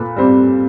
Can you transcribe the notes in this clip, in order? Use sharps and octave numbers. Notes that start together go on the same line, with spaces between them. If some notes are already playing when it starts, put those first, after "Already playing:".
Already playing: A#2 A4 B4
G3 C4